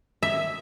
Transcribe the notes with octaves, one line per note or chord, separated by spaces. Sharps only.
E5